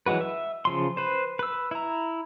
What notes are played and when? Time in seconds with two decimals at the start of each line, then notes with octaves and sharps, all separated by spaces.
0.06 E3 F#3 G#3 F#4 B4
0.21 E5
0.65 C#3 F3 C6
0.97 B4 C5
1.39 B4 E6
1.71 E4 A#5